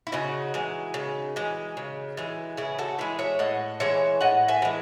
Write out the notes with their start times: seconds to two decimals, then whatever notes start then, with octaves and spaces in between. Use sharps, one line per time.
0.07 E4
0.12 C#3 D#4 F#4
0.54 E3 G#3
0.94 C#3
1.36 E3 G#3
1.77 C#3
2.17 E3 G#3
2.57 C#3 E4 G#4
2.79 F#4 A4
2.98 E3 G#3 E4 G#4
3.19 C#5 E5
3.39 A2 D#5 F#5
3.80 E3 G#3 C#5 E5
4.21 A2 D#5 F#5
4.48 E5 G#5
4.62 E3 G#3